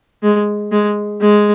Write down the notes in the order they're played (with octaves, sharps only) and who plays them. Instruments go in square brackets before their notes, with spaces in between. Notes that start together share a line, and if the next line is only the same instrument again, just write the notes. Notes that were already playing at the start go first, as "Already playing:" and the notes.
[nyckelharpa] G#3
G#3
G#3